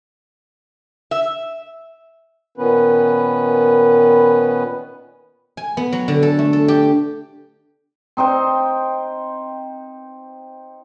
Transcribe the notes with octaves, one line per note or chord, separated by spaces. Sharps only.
E5
A#2 D#3 B3 C#4 B4
G#5
B3
F#3
D3
A4
A3
A4
G4
C4 D#4 C5 G5